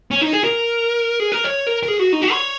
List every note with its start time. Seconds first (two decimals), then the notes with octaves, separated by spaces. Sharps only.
0.11 C#4
0.21 D#4
0.33 G#4
0.44 A#4
1.20 G#4
1.32 A#4
1.44 C#5
1.67 A#4
1.83 A#4
1.88 G#4
1.99 F#4
2.12 D#4
2.22 F#4
2.32 C#5